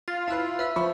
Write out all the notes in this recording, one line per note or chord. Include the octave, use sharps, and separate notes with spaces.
F4 A6
E4 B4 A5 E6 F#6
B4 E5 E6 F#6
F3 C5 B5 C#6